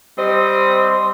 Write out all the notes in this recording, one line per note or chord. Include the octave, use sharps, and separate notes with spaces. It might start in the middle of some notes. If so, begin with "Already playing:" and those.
G3 C4 C5 D#5